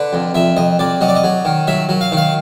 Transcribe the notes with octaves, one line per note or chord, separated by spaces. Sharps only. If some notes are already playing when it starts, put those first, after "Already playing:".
Already playing: D3 B4
F2
F2 E5
F2 D#5
F2 D5
F#3 D#5
D5
D#5
F#3
D#3
F#3 E5
F#3
F5
D#3
F5